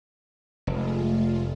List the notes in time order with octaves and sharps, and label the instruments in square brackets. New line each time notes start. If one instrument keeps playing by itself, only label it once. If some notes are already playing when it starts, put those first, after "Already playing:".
[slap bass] F1 [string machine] G#3 A3 F4